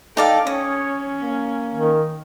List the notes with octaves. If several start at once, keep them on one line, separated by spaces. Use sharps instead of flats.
D#4 A4 D5 F5 G5
C#4 C#5 D#6
A#3
D#3